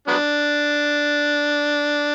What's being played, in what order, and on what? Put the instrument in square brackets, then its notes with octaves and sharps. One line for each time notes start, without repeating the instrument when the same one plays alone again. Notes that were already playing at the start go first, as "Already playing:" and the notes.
[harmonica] F#3 B3 D4